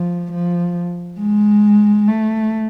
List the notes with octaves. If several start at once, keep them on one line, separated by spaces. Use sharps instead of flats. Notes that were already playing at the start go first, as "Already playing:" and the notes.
Already playing: F3
F3
G#3
A3